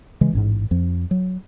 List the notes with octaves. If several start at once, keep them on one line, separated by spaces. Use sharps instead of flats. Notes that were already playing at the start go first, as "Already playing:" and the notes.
C#3 E3 G#3
A1 F2 G#2
F2 F3
F#3